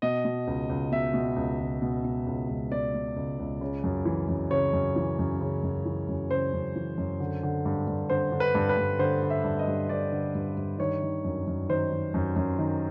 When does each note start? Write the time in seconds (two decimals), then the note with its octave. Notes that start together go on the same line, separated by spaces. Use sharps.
0.02 B2 D#5
0.25 B2
0.47 C#2
0.69 C#2
0.92 B2 E5
1.14 B2
1.36 C#2
1.59 C#2
1.82 B2
2.05 B2
2.27 C#2
2.49 C#2
2.72 B2 D5
2.94 B2
3.16 C#2
3.39 C#2
3.61 C#3
3.84 F#2
4.06 E3
4.28 F#2
4.51 C#3 C#5
4.73 F#2
4.96 E3
5.19 F#2
5.41 C#3
5.63 F#2
5.85 E3
6.09 F#2
6.31 C#3 C5
6.54 F#2
6.76 E3
6.98 F#2
7.20 D3
7.43 D3
7.66 G2
7.88 G2
8.10 D3 C5
8.32 D3
8.40 B4
8.55 G2
8.69 B4
8.77 G2
8.99 D3 C5
9.22 D3
9.30 E5
9.44 G2
9.59 D#5
9.68 G2
9.89 D3 D5
10.12 D3
10.35 G2
10.57 G2
10.79 D#3 C#5
11.02 D#3
11.25 F#2
11.47 F#2
11.69 D#3 C5
11.92 D#3
12.14 F#2
12.36 F#2
12.59 D#3